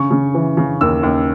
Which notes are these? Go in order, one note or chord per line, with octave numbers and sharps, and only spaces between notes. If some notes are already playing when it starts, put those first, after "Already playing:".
Already playing: C#3 C#6
C#3
E3
C#3
D#2 E6
D#2